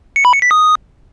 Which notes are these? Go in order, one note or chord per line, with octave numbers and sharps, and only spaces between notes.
C#7
B5
C#7
B6
D#6